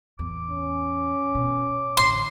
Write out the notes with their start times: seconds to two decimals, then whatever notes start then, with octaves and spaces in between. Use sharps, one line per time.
0.19 A1 E2 D6
0.50 C#4
1.35 B2
1.97 A1 D3 C6